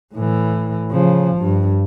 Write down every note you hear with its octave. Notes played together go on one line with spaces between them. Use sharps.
A2 E3
C#3 F3
G2